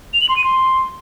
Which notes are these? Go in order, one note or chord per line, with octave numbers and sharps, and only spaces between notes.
F7
F#7
C6
D#7
C6